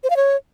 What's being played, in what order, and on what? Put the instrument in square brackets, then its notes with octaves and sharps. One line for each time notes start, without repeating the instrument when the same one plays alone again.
[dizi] C5
F5
C#5